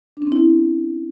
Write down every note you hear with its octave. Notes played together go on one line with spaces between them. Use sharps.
D4
C#4
C4
E4